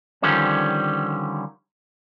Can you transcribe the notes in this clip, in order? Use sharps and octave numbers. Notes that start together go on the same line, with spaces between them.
D3 D#3 F3 G3 C#4